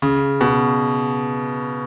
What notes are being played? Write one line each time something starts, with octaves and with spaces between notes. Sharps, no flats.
C#3
B2